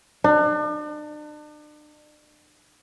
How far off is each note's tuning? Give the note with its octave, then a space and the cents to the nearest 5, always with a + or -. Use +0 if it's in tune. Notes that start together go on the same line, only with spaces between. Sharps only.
D4 +40